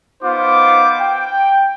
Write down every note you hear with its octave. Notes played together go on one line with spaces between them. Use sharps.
B3 D#4 F4 C5 F5 D6
G5